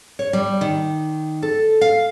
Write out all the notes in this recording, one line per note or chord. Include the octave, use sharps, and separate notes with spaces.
C#5
G3
D#3
A4
F5